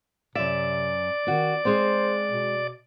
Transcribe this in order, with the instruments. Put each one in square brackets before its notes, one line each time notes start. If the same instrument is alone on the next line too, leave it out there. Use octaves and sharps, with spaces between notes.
[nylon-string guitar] F#2 E5 [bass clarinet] C3 [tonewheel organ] D5
[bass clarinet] D#3 [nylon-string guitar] C4 F#4
[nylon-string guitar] G#3 C4 [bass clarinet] C5
[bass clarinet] B2